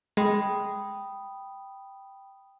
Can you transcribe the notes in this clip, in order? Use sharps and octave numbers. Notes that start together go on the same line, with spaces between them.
G#3 G5 B5 D#6